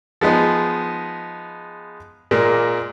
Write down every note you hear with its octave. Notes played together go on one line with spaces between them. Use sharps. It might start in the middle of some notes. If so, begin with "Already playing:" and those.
F3 G#3 B3 D#4 G#4
A#2 G#3 A#3